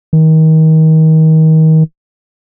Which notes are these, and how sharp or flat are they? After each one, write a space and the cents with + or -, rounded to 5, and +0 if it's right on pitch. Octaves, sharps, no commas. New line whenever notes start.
D#3 +30